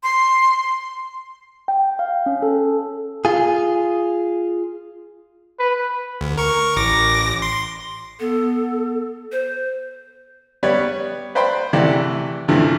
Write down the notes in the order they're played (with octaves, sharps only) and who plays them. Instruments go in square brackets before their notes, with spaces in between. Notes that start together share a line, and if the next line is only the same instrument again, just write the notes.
[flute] C6
[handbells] G5
F5
C#4
A4
[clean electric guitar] F4 G#4
[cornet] B4
[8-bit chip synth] D2
A#4 C#6
A1 D6 A#6
C6
[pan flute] B3 [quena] A4
[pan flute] C5
[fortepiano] G3 B3 B4 C#5 D5
B4 C5 D5 G5 B5 C6
C3 E3 A3 G4 D5 F#5
G2 C3 E3 F3 A3